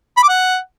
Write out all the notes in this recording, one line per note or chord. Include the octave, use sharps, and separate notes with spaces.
B5
D6
F#5